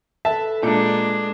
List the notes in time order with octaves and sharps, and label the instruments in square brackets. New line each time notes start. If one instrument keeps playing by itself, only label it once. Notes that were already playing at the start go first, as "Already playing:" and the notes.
[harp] A4 B4 [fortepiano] E5 A5
[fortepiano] A#2 [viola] G#3 D4 [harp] D6 G6 C#7